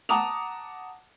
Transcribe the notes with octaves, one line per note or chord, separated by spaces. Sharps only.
F#5 A5 A#5 D6 D#6 F7